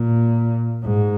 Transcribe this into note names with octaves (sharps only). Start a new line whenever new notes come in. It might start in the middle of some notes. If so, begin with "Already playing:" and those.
Already playing: A#2
G#2